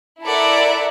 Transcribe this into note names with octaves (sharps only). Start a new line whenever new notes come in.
E4 A4 A#4 D5 E5 F#5